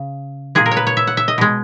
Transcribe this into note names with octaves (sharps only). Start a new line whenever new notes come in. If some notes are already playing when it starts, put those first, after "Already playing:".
Already playing: C#3
A#2 G#3 G#4
A#4
C#5
B4
C#5
E5
F#5
E5
D#5
B2 G#3